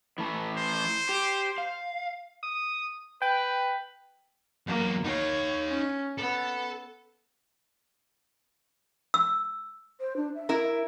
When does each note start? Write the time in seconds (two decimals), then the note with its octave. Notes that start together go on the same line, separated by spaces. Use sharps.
0.18 E3 A3 A4
0.57 C5
1.09 G4
1.58 F5
2.43 D#6
3.22 B4 G5
4.67 E2 F#3 A#3
5.05 D#4 C#5 F5
5.67 C#4
6.19 B3 A4
9.14 E6
10.01 C5
10.16 D4
10.35 E5
10.49 E4 A#4